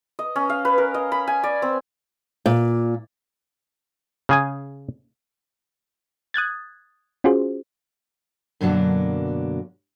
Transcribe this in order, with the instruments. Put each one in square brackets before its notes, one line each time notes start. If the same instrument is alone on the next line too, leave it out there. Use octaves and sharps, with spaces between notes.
[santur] D#5
C#4
F5
B4
A#4
D#5
B5
G#5
D5
C4
[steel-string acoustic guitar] A#2
[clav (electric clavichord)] C#3 G#4 G#5
[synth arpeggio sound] D#6 F#6 G#6 A6
C#4 F4 F#4 G#4 C5
[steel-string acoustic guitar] F#2 B2 D3 F#3 A#3 D4